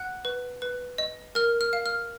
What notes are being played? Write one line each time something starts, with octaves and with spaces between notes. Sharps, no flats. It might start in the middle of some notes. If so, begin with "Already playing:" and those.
Already playing: F#5 F#6
B4
B4
D#5
A#4 F6
F6
F5
F6